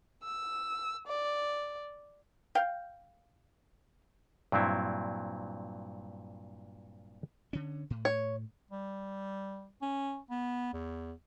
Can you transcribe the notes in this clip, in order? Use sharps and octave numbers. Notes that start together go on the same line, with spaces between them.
E6
D5
F5 G5
G2 A#2 F#3 C4 E4
D3 C#4
A2
C#5
G3
C#4
B3
E2